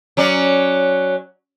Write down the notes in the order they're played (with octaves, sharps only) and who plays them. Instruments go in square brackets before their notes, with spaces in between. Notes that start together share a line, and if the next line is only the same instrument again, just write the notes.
[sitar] F#3 C#4 D5